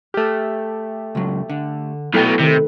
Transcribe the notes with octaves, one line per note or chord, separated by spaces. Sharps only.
A3 G4 F6 A#6
C#2 F#3
D3
B1 B2 A3 E4 A4 G5
C3 D#3 B4